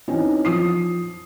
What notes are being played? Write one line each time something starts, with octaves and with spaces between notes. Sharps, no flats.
E3 C4 C#4 D#4
F3 D#6 C7